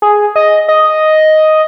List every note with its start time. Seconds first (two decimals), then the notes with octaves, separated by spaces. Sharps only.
0.02 G#4
0.36 D#5
0.69 D#5